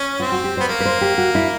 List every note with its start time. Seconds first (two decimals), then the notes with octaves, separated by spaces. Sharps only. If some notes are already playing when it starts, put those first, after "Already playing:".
Already playing: C#4
0.19 C4 F4
0.32 F#4
0.44 G4
0.57 B3 C5
0.68 A#3 C#5
0.80 B4
0.85 C5
1.01 G4
1.18 F#4
1.35 E4